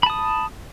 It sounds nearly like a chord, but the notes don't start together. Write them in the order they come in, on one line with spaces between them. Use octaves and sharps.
B5 A5 D#6